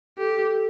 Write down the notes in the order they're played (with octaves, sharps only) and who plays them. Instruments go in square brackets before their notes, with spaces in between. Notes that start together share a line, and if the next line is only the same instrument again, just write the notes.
[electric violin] G4 [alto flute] A4